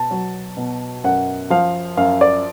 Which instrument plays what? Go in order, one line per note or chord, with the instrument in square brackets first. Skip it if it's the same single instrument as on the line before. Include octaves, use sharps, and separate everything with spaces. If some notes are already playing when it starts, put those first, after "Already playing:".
Already playing: [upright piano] B2 A5
F#3
B2
F#2 F#5
F3 F5
F#2 F5
D5